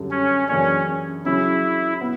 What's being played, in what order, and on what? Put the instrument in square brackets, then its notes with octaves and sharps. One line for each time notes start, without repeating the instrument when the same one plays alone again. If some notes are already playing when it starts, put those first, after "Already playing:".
Already playing: [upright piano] F#2 D3 G3
[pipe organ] C#4
[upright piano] F#2 C#3 E3 A#3 D4 [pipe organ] C#4
[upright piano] C#3 F#3 C#4 [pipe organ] E4
[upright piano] B3